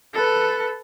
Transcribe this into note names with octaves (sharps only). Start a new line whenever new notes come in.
A4 B4